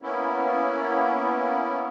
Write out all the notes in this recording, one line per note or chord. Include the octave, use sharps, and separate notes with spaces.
A#3 B3 C#4 E4